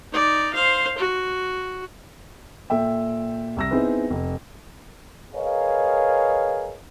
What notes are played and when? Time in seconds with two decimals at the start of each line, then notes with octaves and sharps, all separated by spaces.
0.12 D#4 D5
0.54 C5 F5
0.99 F#4
2.70 A#2 A4 E5 G5
3.57 C2 E6 A#6
3.71 B3 C4 D#4 E4 G#4 B4
4.10 F1
5.34 G#4 A#4 B4 C#5 D#5 F5